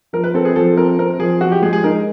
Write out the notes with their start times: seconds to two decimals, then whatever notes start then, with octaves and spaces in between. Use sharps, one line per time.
0.13 F3 A#4
0.24 B4
0.34 C4 A4
0.45 G#4
0.56 F3 A4
0.77 C4 A#4
0.99 C4 A#4
1.19 F3 G#4
1.41 F3 F#4
1.52 G4
1.62 G#3 G#4
1.73 G#4
1.83 D#4 A#4